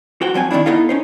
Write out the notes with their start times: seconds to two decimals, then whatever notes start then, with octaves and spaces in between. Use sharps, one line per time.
0.21 F#4 C5 G5
0.34 F3 F#3 C4 G#5
0.51 D#3 E3 C4 D4 E4
0.66 B3 D#4 E4 A4 D#5 F5
0.89 C#4 D#4 C5